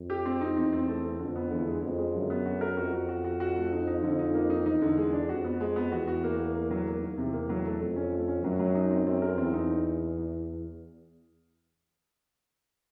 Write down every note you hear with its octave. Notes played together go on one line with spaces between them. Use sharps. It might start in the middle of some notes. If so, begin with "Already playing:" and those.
Already playing: F2
G4
C4
D#4
E2 C4
C4
A3
A3
F2 D3
B3
E2 D3
G#3
F2 G#3
G#3
F#2 D3
B3
F#4
A#4
F2 F#4
F#4
F#4
F#4
F#4
A3
D#4
D#4
F2 D3
D#4
A#3
D#4
E2 D#4
D3
G#3
D4
F2 F#4
B3
G#3
B3
E2 F#4
F#4
A#3
A#3
A#3
F#3
A#3
D#3
E2 C3
A#3
F#3
A3
F2 A3
C#4
A3
C#4
F#2 F#3
F#3
D#4
C4
F#2 C4
A#4
E2 C4
D#4